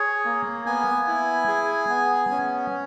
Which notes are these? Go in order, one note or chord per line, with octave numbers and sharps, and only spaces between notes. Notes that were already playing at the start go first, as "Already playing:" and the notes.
Already playing: G#4 C#5
A#3
B3 G#5
E4
G#4
B3
C#4